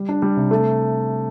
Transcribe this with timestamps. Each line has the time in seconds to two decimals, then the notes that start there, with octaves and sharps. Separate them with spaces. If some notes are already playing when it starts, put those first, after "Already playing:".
Already playing: G3
0.09 D4
0.22 G3
0.37 C3
0.51 A3